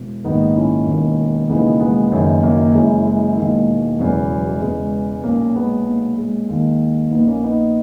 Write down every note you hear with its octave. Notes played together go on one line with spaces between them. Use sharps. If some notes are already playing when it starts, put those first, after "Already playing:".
Already playing: E1
A#1 G#2 D#3 B3 D#4
C#4 E4
E1 D#2 D#3
E1 D#2 C#3 E3 B3 D#4
G#3 B3
F#1 F#2 D#3
F#3 A#3
F#1 F#2 E3 G#3
G#3
E1 D#2 D#3
E1 E2 C#3 E3 F#3
F#3
G#3
E1 E2 C#3 E3 G#3
B1 A#2 A#3 C#4
G#3 B3
B1 A#2
G#3
D#2 D#3
A#1 A#2 B3 D#4
A#3 C#4
B3 D#4